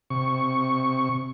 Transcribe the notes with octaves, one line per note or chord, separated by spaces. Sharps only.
C3 C#6